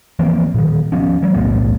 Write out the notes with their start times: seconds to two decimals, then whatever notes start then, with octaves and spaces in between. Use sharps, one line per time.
0.19 E3 F3 A#3 C4
0.54 A#2 D#3
0.92 F3 B3 C#4
1.23 F#3 G#3
1.34 E1 B1 A2 B3